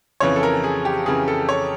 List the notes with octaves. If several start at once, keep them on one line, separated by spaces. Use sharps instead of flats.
F2 C#3 E3 C#5
A4
A#4
G#4
G4
F2 C#3 E3 G#4
A4
C#5